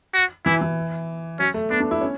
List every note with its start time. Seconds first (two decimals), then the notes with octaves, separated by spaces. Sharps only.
0.14 F#4
0.45 E3 E4
0.61 E3
1.39 F#3 C#4
1.54 A3
1.70 B3 D4
1.80 D4
1.91 E4
2.01 C#4